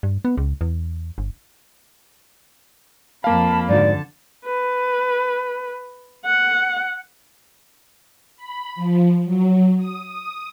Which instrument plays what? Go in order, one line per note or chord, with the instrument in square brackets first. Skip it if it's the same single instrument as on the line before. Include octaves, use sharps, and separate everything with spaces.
[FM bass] G2
B3
C#2
E2
G1
[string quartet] F2 B5 [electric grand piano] A#3 F5 [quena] A5
[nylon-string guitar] G#2 D#4 F#4 [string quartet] D3 A5 [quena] D5
[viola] B4
F#5
[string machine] B5
F3
F#3
D#6
D#6